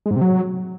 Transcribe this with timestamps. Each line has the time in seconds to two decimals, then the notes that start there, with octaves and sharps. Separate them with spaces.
0.06 G#3
0.11 G#2
0.16 C3
0.21 F#3